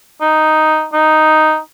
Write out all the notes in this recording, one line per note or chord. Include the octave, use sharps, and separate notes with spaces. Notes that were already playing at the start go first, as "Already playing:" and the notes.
D#4
D#4